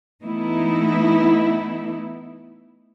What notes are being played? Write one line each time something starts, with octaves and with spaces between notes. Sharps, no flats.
E3 A3 B3 D#4 E4